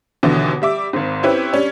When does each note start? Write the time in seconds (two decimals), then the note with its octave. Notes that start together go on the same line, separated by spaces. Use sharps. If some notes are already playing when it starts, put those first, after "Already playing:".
0.23 D#2 B2 D3 E3
0.62 G3 E5 D6
0.93 G#1 G#2
1.23 C4 C#4 E4 G4 B4
1.53 G3 C#4 D4